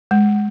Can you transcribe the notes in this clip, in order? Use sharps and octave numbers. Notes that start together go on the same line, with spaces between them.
G#3